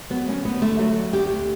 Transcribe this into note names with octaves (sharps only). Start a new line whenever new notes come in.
F#3 B3
D2 C#4
D2 B3
D3 A3
F#3 A3
D2
D2 G4
D3